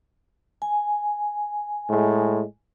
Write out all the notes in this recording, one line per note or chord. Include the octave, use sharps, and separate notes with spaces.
G#5
A2 G#3